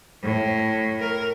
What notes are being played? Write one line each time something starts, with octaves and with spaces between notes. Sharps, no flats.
A2
A#4